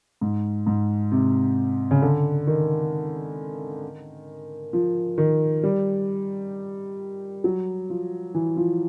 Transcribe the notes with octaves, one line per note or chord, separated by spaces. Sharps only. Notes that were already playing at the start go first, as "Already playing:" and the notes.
G#2
G#2
C3
C#3
D3
D#3
F3
D#3
G3
F#3
F3
E3
F3